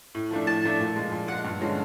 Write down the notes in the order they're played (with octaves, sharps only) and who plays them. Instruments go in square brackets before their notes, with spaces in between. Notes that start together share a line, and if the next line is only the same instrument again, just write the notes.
[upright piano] A2
F3 A3 D4
[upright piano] A2 [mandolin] A5
[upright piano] F3 A3 D4
A#2
F3 G#3
A#2
[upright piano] F3 G#3 [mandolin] F#5
[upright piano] G2
D3 F3 G#3 C#4